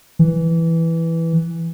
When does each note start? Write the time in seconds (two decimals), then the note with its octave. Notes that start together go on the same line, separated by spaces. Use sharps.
0.19 E3